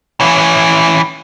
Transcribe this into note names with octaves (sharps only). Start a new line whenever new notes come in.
E3 C#4